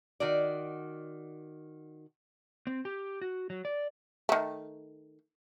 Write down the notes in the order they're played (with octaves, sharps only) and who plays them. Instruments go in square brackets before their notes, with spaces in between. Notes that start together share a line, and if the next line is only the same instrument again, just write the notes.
[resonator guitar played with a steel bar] D#3 F#4 D5
[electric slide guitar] C4
G4
F#4
F#3
D5
[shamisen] D#3 A3